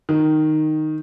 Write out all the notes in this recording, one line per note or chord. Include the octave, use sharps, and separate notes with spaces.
D#3